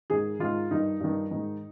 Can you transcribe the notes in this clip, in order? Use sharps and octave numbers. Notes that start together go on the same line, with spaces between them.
G#2 D#3 G#4
G#2 D#3 F4
G2 D#3 D#4
G2 D#3
G#2 D#3